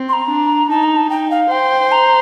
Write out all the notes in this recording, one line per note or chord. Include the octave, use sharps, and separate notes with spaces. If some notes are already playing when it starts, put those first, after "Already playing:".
Already playing: C4
C6
A#5
D4
D#4 A5
A#5
A5
D#4 G5
F5
C5 G5
A#5